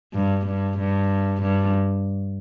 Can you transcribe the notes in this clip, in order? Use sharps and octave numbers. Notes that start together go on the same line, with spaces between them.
G2
G2
G2
G2